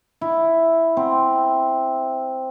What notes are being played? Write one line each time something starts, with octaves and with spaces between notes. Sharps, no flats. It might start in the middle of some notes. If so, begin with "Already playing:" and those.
E4
C4